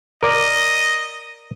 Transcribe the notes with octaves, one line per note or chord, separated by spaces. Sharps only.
A#4 D5 D#5